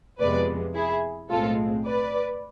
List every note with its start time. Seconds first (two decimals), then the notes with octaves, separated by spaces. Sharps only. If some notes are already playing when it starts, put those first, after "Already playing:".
0.20 F2 C3 F3 G#3 B3 B4 D5
0.75 E4 G#4
1.30 B1 A2 G#3 C4 F4 A4
1.86 B4 D5